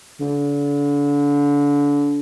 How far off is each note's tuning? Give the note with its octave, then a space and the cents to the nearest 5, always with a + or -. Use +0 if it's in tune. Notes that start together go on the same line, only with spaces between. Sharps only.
D3 -35